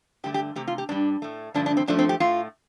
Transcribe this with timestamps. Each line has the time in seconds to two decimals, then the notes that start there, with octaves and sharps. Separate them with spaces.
0.24 G2 D3 A3 G4
0.34 G4
0.56 C3 A3 G4
0.68 F4
0.78 G4
0.89 G2 G3 D4
1.22 A2 A3
1.54 G2 D3 F3 A3 D4
1.66 D4
1.77 C4
1.87 G2 F3 A3 D4
1.99 C4
2.09 G4
2.20 A2 A3 F4